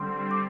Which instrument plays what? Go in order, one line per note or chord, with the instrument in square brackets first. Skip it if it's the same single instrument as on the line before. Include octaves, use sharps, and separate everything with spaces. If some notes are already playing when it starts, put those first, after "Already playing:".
Already playing: [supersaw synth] D3 G3 C4 [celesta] C6
[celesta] D6